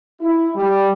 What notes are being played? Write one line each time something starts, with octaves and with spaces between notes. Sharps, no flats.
E4
G3